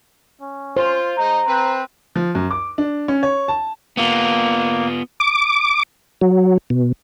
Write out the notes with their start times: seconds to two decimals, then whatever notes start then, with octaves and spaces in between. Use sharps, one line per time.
0.41 C#4
0.77 F4 C5
1.18 G#3 D#4 A#5
1.46 C4 B4
2.16 F3
2.35 F#2
2.51 D6
2.78 D4
3.08 C#4
3.23 C#5
3.48 A5
3.97 A#3 B3 F4
5.20 D6
6.21 F#3
6.70 B2